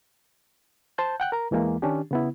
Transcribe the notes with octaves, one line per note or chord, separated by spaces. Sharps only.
C5 A5 G6
F#5 G5 F#6
A#4 A#5
E2 E3 G#3 A#3
D#3 C#4 D4 G4
C#3 B3 E4